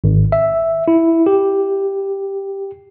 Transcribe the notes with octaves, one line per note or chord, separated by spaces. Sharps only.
G#1
E5
E4
G4